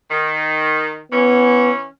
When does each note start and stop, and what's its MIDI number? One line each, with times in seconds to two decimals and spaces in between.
0.10 1.01 51
1.12 1.84 52
1.12 1.71 59
1.12 1.84 61